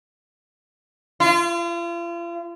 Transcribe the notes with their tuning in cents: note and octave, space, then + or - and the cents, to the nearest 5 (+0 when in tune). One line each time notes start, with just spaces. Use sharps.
F4 -40